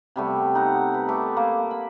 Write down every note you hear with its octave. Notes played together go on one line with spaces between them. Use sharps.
C3 G3 A3 B3
D#4 F#5
B4
A3 A4 B4 D6
A#3
B5